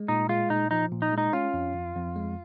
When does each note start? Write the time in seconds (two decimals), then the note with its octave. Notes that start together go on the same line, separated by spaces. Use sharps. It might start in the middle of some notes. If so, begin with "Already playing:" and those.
Already playing: G#3
0.08 A#2 D#4
0.29 G#3 F4
0.50 A#2 D#4
0.71 F3 D#4
0.92 A#2
1.02 D#4
1.13 G#3
1.18 D#4
1.33 C#4 F4
1.54 F2
1.75 F2
1.96 F2
2.16 G#3